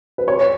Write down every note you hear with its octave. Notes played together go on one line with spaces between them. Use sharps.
B4
C#5